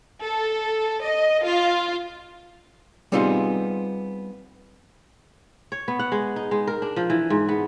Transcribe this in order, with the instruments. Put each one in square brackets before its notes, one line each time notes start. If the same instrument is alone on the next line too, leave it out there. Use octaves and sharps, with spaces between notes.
[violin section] A4
D#5
F4
[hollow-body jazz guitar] G3 B3 C4 D#4 F4 G#4
[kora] C#5
B3
F#5
G#3
D#4
G#3
A#4
D4
F3
E3
G#2
B3